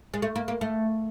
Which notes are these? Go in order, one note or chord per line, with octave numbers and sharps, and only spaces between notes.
G#3
A3
A#3
A#3
A3